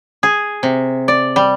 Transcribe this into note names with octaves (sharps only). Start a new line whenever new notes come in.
G#4
C3
D5
G3